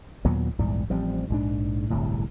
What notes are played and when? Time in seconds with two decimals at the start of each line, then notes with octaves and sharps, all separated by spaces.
0.25 D#2 A#2 F#3 B3
0.58 A#1 E2 G#2 G3
0.89 A1 F3 G3 C4
1.29 A#1 G#2 D4
1.90 D1 G1 C2 A2